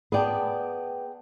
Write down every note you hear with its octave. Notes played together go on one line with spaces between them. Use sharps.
B3 G#4 D5 G5 A5